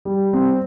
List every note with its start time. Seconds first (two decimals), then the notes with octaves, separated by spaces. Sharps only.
0.05 G3
0.33 C4